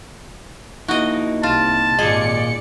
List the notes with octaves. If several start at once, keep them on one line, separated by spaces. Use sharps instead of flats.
A#3 D#4 E4 F#4 D#5
C2 C3 F4 A5
G#1 A#2 F4 G#4 D5 D#5 C#7